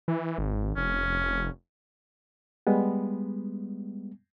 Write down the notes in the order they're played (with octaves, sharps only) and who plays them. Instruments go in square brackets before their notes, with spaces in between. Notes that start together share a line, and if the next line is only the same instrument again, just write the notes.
[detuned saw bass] E3
G#1
[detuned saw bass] F1 [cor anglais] C#4
[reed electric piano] G3 G#3 B3